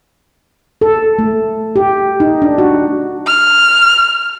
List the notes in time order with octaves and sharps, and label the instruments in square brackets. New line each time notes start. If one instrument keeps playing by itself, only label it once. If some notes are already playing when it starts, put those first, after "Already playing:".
[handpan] A4
A3
G4
D#4
D4
F#4
[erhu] F6